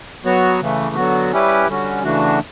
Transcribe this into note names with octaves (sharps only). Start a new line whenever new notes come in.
F#3 B3 F#4 C#5
C#3 E3 A3
D3 F#3 B3 F#4
G3 C#4 E4 G4 B4
D3 G3 C#4 F#4
C#3 E3 A3 D4 F#4